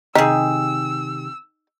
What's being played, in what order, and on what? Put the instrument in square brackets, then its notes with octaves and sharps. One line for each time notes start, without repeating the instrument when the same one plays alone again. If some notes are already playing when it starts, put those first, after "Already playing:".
[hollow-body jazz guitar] C3 D#3 [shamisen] D#4 [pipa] G4 G#4 [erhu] E6